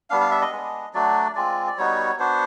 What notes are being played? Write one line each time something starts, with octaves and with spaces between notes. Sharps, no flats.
G3 B3 D4 F5
F5
E5
D#5
G#3 B3 D4
F#3 A3 D4 F#4 D5
G#3 C4 F4 D5
D5
G3 B3 D#4 F#4 C#5
B3 D4 F#4 C5